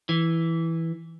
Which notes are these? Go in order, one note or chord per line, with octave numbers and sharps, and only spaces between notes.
E3